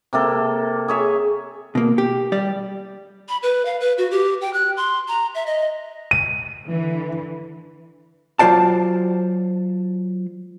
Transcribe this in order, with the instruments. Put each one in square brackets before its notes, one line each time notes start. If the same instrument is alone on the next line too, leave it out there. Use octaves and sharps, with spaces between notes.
[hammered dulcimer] C3 A#3 A4
G#4 C#5 E5
[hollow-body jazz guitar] B2 A#3
G4
G3 G4 D5
[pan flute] B5
B4
F5
B4
F#4
G4
G5
F#6
C6
A#5
E5
D#5
[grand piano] D#7
[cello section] D3 E3
[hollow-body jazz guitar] F#3 F4 C5 D5 A5